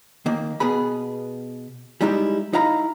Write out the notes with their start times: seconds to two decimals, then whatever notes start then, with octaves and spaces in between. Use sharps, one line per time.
0.26 D#3 A#3
0.60 B2 B3 G#4 B5
2.01 G3 G#3 D#4 E4 G4
2.53 D#4 E4 F5 A#5 B5